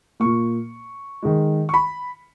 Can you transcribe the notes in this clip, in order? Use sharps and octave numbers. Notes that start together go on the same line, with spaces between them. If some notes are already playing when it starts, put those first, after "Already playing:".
A#2 A#3 C#6
D#3 G#3
C#6
B5